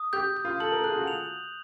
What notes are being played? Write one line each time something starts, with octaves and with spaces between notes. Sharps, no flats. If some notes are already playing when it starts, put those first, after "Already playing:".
Already playing: D#6
G4 G6
G6
F4
A4 F#7
A#4
G#4 F#6
F4
F#4
F7